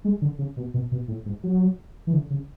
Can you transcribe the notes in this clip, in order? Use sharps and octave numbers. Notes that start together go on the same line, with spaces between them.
G#3
D3
C#3
B2
B2
B2
A2
G#2
F#3
E3
D3
C#3